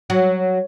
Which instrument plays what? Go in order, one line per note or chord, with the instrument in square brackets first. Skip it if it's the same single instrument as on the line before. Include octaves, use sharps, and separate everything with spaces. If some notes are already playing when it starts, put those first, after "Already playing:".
[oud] F#3